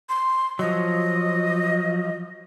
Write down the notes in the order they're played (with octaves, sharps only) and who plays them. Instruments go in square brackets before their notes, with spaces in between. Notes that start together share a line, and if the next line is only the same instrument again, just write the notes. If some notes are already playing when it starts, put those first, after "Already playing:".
[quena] C6
[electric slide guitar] F3 F#3 [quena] D#5